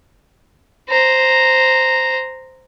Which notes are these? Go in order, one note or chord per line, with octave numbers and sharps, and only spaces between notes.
C5 A#5